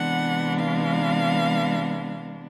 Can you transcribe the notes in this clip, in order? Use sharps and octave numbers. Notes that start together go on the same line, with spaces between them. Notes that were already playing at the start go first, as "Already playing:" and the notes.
Already playing: C3 E3 G#3 B3 D4 F#5
F5